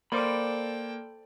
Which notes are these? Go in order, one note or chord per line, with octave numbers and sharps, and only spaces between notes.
A#3 A4 C5 D5 G5 B5 D6